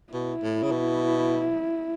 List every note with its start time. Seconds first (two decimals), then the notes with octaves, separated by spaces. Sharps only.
0.13 B2 E4
0.43 A2
0.63 C#3
0.72 B2